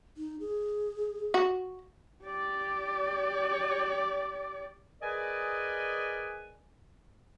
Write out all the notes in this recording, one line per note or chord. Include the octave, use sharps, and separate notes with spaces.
D#4
G#4
F#4
G4 D5
G#4 A#4 B4 D5 D#5 G#5